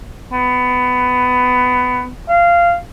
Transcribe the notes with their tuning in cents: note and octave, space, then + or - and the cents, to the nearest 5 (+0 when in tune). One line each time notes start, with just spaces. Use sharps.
B3 +20
F5 -15